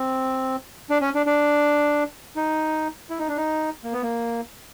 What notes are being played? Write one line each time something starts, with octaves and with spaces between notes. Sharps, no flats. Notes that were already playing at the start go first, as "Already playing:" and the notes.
Already playing: C4
D4
C#4
D4
D4
D#4
E4
D#4
D4
D#4
A#3
B3
A#3